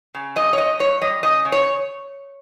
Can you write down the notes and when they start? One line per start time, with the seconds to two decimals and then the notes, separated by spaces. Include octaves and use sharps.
0.15 C#3
0.36 G2 D#5
0.53 C#5
0.58 G2 D#5
0.79 G2 C#5
1.02 G3 D#5
1.23 C#3 D#5
1.45 C#3
1.52 C#5